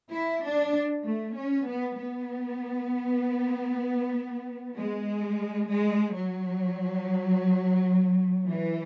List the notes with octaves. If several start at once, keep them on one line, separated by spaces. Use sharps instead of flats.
E4
D4
A3
C#4
B3
B3
G#3
G#3
F#3
E3